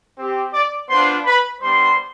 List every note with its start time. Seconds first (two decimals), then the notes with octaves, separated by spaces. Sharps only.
0.17 C4 G4
0.53 D5 D6
0.90 B3 D4 F4 C5 C6
1.25 B4 B5
1.61 G3 B3 D4 C5 C6